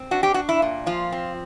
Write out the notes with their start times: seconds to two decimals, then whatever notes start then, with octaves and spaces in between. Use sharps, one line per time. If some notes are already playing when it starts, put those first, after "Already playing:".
Already playing: C4
0.11 D4 F#4
0.23 G4
0.34 D4 F#4
0.49 E4
0.62 A#2
0.86 F3 F4
1.12 C4